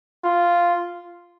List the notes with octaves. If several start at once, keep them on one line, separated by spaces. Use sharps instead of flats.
F4